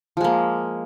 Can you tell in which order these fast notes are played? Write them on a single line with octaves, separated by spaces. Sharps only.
F3 G#3 A#3